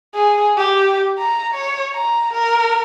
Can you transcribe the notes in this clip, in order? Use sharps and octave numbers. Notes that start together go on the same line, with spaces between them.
G#4
G4
A#5
C#5
A#5
A#4